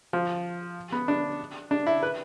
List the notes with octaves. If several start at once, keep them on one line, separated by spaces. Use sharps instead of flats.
F3
B3
D4
D4
E4
B4